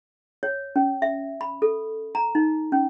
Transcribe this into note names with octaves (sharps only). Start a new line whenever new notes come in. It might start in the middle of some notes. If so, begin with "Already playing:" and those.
C#5
C#4
E5
B5
A4
A#5
D#4
C#4